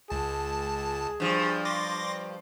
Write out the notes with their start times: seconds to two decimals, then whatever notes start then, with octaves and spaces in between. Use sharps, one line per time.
0.10 C#2 G#4 A5
1.20 G2 F3
1.65 C6 D6 A#6